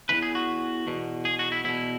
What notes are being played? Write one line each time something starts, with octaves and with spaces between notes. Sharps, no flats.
E2 C#3 E3 B4
G#4
F#4
E2 B2
G#4
F#4
E4
E2 B2 E4